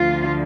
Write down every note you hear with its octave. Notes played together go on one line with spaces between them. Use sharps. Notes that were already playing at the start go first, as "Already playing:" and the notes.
Already playing: D2 D3 F3 F4